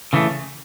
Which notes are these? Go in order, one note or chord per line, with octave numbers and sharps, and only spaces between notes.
C#3 E3 A3